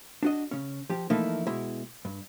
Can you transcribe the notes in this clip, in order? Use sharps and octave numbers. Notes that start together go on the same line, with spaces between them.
D4 F#4 D#5
C#3 C#4
F3 G4
E3 F3 A3 A#3 D#4 E4
B2 G#3 E4
G2